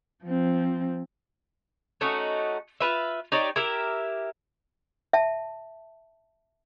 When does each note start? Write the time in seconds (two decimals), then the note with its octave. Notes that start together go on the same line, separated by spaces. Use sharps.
0.25 F3 C4
2.01 A3 C#4 D#4 F#4
2.80 F4 B4 E5
3.32 D#4 G4 C#5 D5
3.56 E4 G4 A#4 E5
5.13 E5 A5